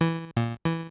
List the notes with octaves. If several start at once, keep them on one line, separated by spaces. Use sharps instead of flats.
E3
A#2
E3